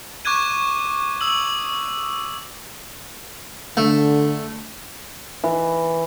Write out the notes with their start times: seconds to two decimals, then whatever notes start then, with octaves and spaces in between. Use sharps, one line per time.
0.25 C#6 D6 F#6 G#6 D#7
1.21 D#6 E6 F#7
3.77 D3 A3
5.44 E3